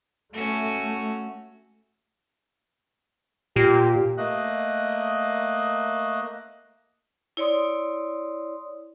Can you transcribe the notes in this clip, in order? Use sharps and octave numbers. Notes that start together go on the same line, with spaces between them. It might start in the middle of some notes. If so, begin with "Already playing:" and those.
A3 C#4 F#4
A#2 G4
A3 A#3 D#5 F#6
E4 C#5 D5 C6 D#6